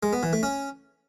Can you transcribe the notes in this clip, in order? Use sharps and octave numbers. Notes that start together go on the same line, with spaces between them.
G#3
B3
E3
A3
C#4